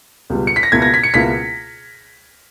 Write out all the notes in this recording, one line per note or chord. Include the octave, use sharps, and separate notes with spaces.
C#2 B2 G3
C#7
B6
A#6
C#2 B2 A#3 E4 G#6
A#6
B6
C#7
C#2 B2 A#3 E4 B6